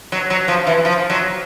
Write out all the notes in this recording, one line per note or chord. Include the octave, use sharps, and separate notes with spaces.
F#3
F#3
F3
E3
F3
F#3